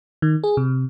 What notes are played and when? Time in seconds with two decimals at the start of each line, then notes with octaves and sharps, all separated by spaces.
0.22 D#3
0.44 G#4
0.57 C3